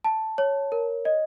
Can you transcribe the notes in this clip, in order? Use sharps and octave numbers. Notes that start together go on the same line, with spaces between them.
A5
C#5
A#4
D#5